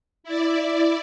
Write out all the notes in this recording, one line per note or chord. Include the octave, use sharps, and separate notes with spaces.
E4 D5